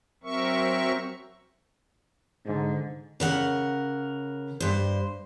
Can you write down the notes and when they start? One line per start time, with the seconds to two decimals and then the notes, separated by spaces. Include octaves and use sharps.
0.23 F#3 C4 A#4 E5 C#6
2.46 G#2 D3
3.20 C#3 A#4 F#5
4.60 G2 C5